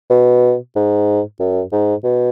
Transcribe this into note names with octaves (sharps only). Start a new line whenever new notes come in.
B2
G#2
F#2
G#2
B2